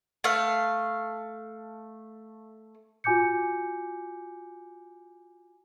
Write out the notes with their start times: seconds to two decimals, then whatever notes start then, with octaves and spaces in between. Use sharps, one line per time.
0.24 A3 F5
3.04 F4 F#4 G#5 D6 G6 C#7